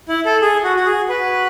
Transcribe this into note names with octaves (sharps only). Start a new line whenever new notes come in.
E4
A4
G#4
F#4
F#4
G#4
F#4 B4